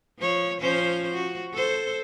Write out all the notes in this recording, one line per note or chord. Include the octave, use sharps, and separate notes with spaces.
F3 C#5
F3 C#4 C5
F#4
A4 C5